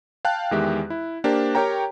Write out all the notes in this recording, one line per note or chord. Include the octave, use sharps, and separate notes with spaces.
F5 G5 A5 F#6
E2 D#3 G#3 G4 E5
E4
A#3 D4 G4 A#4 C5
G4 A#4 C#5 G5 A#5